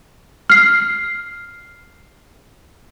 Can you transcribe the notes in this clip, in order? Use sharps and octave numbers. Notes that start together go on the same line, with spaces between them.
F6 C7